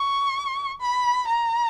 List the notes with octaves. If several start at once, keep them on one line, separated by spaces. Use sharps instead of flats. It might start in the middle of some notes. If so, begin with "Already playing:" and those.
Already playing: C#6
B5
A#5